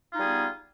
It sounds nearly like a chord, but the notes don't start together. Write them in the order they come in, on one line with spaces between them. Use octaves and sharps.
F4 D#4 G3 G#4 B3